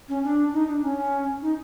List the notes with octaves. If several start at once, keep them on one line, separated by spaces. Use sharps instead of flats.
C#4
D4
D#4
D4
C#4
D#4